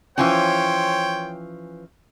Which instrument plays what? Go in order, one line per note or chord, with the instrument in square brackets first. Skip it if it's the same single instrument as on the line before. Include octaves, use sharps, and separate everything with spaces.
[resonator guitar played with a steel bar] E3 F3 C#4 [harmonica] C5 C#5 G5